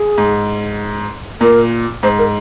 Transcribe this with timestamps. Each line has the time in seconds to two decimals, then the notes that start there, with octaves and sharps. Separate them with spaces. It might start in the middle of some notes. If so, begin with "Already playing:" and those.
Already playing: G#4
0.18 G#2
1.41 A#2 A#4
2.03 G#2 C5
2.18 A#4